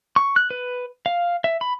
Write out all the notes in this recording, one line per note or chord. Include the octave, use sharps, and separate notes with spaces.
C#6
F#6
B4
F5
E5
B5